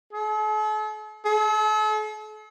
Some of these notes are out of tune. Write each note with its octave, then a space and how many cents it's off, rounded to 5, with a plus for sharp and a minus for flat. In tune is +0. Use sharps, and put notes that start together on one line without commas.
A4 -45
A4 -45